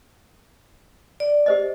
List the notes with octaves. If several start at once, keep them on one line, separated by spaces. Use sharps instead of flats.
D5
G4 C5 D#5